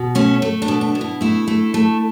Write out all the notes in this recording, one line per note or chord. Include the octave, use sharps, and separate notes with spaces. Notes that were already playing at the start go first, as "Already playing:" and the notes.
Already playing: B2
A3 C#4
A3
D4
B2
D4
B2
E4
A3 E4
A3
A3